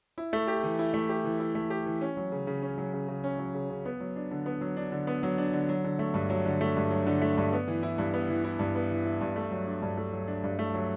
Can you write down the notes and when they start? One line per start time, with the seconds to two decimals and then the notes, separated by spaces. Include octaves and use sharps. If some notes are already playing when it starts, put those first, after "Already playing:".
0.18 E4
0.33 A3
0.48 G4
0.63 E3
0.79 E4
0.94 A3
1.09 G4
1.24 E3
1.40 E4
1.55 A3
1.70 G4
1.86 E3
2.01 C#4
2.17 F#3
2.32 C#3
2.47 C#3
2.62 C#4
2.78 F#3
2.93 C#3
3.08 C#3
3.24 C#4
3.39 F#3
3.54 C#3
3.70 C#3
3.85 B3
4.00 F#3
4.16 D4
4.31 D3
4.46 B3
4.61 F#3
4.77 D4
4.92 D3
5.07 B3
5.23 F#3
5.38 D4
5.53 D3
5.69 F#3
5.84 D3
5.99 A3
6.14 G2
6.30 F#3
6.46 D3
6.61 A3
6.76 G2
6.91 F#3
7.07 D3
7.21 A3
7.37 G2
7.53 B3
7.68 E3
7.83 E4
7.98 G2
8.14 B3
8.29 E3
8.44 E4
8.59 G2
8.75 B3
8.91 E3
9.05 E4
9.21 G2
9.36 A3
9.51 F#3
9.67 D4
9.82 G2
9.97 A3
10.13 F#3
10.28 D4
10.44 G2
10.59 A3
10.74 F#3